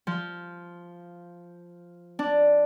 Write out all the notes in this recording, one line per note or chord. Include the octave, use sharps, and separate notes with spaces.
F3
D4